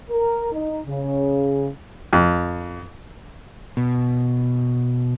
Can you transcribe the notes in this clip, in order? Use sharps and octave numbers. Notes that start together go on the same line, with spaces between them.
A#4
D#4
C#3
F2
B2